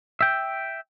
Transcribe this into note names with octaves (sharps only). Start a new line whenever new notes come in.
E5 G5